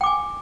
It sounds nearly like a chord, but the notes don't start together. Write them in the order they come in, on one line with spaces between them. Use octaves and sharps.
G5 D6 G#5